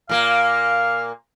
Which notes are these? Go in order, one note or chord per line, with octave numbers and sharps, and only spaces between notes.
A#2 A#3 F5